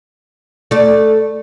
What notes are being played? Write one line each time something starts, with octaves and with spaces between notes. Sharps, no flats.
A3 D5